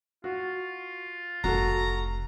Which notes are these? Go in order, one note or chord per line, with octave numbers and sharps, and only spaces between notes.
F4 F#4
F1 F#4 A4 A#5